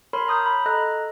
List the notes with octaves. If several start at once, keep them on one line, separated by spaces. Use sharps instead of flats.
A#4 C#5 B5 C6 F6
A#5 D#6 G6
B5
A4 D#5 A#5 F#6